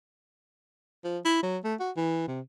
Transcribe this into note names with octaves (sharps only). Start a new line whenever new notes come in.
F3
E4
F#3
A3
F#4
E3
C3